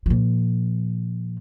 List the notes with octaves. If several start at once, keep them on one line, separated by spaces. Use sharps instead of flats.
A#2 F3